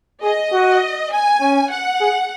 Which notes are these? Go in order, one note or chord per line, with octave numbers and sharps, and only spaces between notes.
G#4 D#5
F#4
G#5
C#4
F#5
G#4